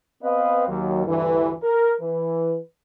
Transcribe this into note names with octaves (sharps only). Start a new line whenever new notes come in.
B3 C4 B4 D#5 F5
D#2 F#3
D2 G2 E3
A#4
E3 B4